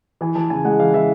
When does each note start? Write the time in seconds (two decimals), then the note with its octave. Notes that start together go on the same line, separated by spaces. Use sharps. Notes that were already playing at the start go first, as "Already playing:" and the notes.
0.21 E3 G#5
0.35 E3 A5
0.50 C#3 G#5
0.64 G#3 F#5
0.80 E3 F5
0.94 E3 E5